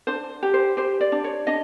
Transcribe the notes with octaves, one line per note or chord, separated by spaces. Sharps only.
D4 C5
G4
C5
G4 C5
D5
D4
C#5
D4 D#5